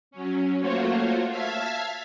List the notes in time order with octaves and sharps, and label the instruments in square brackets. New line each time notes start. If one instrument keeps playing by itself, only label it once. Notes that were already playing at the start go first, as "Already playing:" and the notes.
[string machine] F#3 C#4
A3 A#3 F4 F#4 C5 C#5
E5 F5 A5 F6 G#6 B6